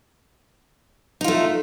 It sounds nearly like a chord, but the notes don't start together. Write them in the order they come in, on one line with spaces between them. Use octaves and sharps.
D#4 F4 A3